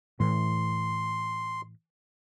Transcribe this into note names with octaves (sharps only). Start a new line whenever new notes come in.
A2 E3 C6